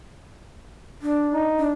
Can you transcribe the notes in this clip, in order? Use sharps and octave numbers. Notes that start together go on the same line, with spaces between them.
D4
D#4
D4